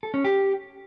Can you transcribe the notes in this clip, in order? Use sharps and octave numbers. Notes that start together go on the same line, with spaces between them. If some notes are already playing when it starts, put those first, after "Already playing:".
A4
C#4
G4